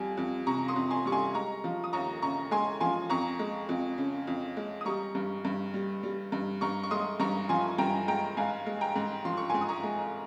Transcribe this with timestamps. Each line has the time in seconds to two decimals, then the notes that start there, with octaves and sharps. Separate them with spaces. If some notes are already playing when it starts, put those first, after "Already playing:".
Already playing: F2 G3 G#5
0.17 F2
0.47 C3 A#5 C#6
0.68 C6 D#6
0.76 F2
0.91 G#5 C6
1.06 G3 C#6
1.12 G#5 C6
1.34 G#3 A#5 C#6
1.64 F3
1.84 D#6
1.93 D#2 A#5 C#6
2.22 C#3 A#5 C#6
2.51 G#3 G#5 C6
2.80 F3 G#5 C6
3.10 F2 A#5 C#6
3.39 G#3
3.69 F2
3.98 C#3
4.27 F2
4.57 G#3
4.81 D#6
4.86 G3 A#5 C#6
5.15 G2
5.45 G2
5.74 G3
6.03 G3
6.32 G2
6.61 G2 A#5 C#6
6.83 C#6
6.91 G#3 C6 D#6
7.20 G2 A#5 C#6
7.49 F3 G#5 C6
7.78 G2 G5 A#5
8.08 G#3 G5 A#5
8.37 G#2 F5 G#5
8.66 G#3
8.81 G5 A#5
8.96 G#2
9.25 F3 C6
9.37 C#6
9.50 G#2 G#5 C6
9.61 D#6
9.69 A#5 C#6
9.83 G#3